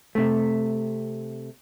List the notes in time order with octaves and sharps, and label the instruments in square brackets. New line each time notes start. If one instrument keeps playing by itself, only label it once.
[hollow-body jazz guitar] C3 A3